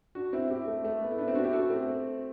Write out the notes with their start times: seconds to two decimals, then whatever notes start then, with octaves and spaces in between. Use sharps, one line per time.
0.15 D4 F#4
0.33 C4 E4
0.50 E4 G4
0.67 A3
0.85 A3
1.02 B3
1.11 E4
1.18 B3 D4
1.27 C4 E4
1.35 D4 F#4
1.44 E4 G4
1.53 F#4 A4
1.70 A3 C4